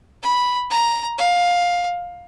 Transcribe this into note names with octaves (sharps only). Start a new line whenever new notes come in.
B5
A#5
F5